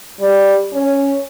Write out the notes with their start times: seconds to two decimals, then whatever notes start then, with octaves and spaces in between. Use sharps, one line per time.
0.21 G3
0.74 C#4